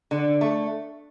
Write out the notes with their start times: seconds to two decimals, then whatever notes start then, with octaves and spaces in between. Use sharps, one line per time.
0.11 D3
0.41 A3